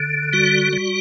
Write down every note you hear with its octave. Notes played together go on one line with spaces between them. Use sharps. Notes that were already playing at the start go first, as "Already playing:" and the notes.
Already playing: D3
G3 F#4
G3